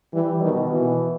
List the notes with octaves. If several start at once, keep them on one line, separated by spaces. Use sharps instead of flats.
E3 G3
B2 D#3
B2 E3